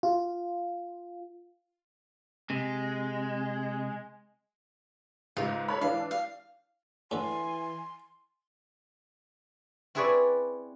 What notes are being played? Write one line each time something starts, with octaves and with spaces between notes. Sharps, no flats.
F4
C3 G#3
C#2 G#2 F4
A4 C#5 B5
E3 D4 F5
F5
A2 D3 E3 G#5 C6
C4 E4 G#4 B4 C#5 D5